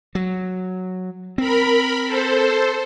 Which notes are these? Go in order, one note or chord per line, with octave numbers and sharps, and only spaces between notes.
F#3
C4 A#4 B5
A4 C5